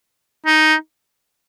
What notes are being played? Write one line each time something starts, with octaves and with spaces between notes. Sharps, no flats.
D#4